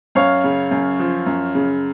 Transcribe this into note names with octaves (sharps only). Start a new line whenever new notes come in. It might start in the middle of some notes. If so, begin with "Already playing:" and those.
F#2 C#5 F5
C#3
F#2
F3
F#2
C#3